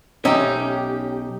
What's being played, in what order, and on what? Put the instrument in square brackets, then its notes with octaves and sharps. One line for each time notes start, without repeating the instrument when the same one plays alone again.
[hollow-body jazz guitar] B1 C#4 E5 [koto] D#4 G4